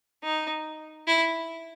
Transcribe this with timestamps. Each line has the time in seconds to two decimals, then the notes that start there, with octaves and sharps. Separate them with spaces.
0.23 D#4
1.07 E4